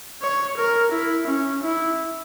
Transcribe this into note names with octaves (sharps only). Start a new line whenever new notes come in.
C#5
A#4
E4
C#4
E4